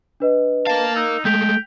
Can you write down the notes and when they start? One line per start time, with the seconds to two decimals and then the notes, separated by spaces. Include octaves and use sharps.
0.20 D4 B4 D#5
0.67 A#4 F5 A5
0.96 D#4 E6
1.25 G#3 A3 G5 G6 B6 F7